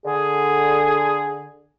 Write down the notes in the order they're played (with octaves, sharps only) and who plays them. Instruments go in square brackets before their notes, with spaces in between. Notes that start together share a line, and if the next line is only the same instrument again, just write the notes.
[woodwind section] D3 [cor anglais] G#4